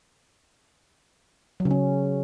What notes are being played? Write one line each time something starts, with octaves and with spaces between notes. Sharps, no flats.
F#3
C#3
C#4